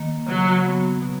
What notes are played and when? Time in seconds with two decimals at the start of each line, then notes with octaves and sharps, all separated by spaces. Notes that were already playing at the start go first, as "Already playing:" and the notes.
Already playing: D#3 A#3
0.27 C#3 F#3
0.65 F#3 B3 F#4
1.02 B2